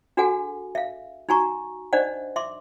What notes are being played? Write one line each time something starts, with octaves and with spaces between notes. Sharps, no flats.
D4 F#4 G#4 A4 F#5 G#5
E5 F5
D#4 F#4 G#5 A#5 C#6
D4 D#4 C5 D5 D#5 F#5
E5 C6 D6